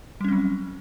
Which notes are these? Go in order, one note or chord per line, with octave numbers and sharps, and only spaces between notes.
F#3 G3 C4 C#4